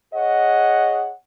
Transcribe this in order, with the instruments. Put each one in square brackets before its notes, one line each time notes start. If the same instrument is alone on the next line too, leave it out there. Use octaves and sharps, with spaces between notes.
[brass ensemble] G#4 C#5 D#5 F#5